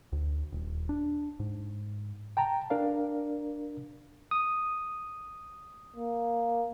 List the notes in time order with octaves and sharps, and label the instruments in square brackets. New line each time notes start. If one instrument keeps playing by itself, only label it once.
[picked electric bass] D2
D#1
D4
G#2
[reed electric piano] G5 A5 A#5
D4 A#4 D5 F5
[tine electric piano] D#6
[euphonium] A#3